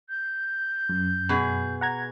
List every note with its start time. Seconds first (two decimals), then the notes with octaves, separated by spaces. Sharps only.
0.09 G6
0.89 F#2
1.29 B2 G#4
1.81 F#5 A#5 G#6